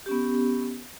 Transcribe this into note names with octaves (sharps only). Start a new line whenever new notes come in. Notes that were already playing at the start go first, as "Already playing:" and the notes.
B3 C#4 G4